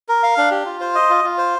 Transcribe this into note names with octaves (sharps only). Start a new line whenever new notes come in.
A#4
F5
D4
G4
F4
C5
D#5
F4
F4
C5